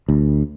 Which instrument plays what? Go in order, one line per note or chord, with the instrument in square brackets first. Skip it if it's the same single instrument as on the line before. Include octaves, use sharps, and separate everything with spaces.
[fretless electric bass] D2